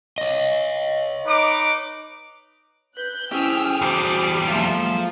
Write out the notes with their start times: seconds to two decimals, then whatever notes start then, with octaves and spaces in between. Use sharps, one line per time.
0.18 C#5 D#5
1.26 D#4 B4 D6
2.97 B4 F#6 G6
3.32 C#4 E4 G4 G#4 C5 G5 E6 F6
3.82 E2 G3 F#4 C5 D6
4.48 F#3 G#3 A#3 F4 G#4 A4 C5 E5